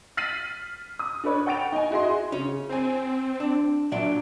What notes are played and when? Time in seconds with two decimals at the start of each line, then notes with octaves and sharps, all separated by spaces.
0.17 F6 A6 B6 C7 D#7 F#7
0.99 D#6
1.24 D4 A4 B4 C#5
1.46 F#5 G5 C#6 A6 D7 F7
1.72 D#4 G#5
1.90 E4 F#4 G#4 D#5 C6
2.32 C#3 C#4
2.69 C4 C5 G#5
3.40 D4
3.92 A#2 F#3 D4 D5 E5